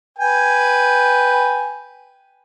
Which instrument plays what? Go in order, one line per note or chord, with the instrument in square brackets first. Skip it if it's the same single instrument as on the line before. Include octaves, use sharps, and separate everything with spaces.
[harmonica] B4 G5 G#5